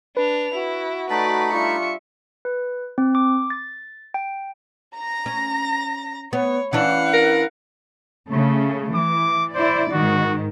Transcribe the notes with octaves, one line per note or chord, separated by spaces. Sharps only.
D4 B4 F7
E4 F#4
A3 D#4 B4 D5 A5 B5
G3 D4 F4 E5 C#6 C#7
B4
C4
D6
A6
G5
A#5 A#6
C#4
B3 C#5
E3 C#4 D4 F5 F#5
A#4
C#3 A3
E3 D6
E4 C5 D5
G#2 D#3 F#4